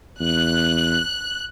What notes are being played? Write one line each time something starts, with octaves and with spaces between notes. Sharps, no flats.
E2 F#6